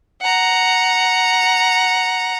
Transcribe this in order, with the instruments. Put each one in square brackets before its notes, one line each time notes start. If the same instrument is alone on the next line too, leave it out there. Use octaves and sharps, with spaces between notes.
[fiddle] F#5 A#5